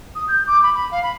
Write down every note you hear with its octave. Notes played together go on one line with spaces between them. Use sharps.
D#6
G6
D6
B5
B5
F5
B5